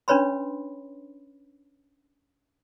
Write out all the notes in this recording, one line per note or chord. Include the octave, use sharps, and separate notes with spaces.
C#4 D4 B4 C#5 B5 C6